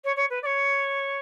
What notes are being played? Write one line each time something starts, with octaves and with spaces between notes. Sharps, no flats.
C#5
C#5
B4
D5
C#5